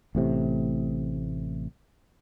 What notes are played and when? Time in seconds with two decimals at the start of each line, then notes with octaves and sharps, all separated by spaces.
0.15 A1 A2 C3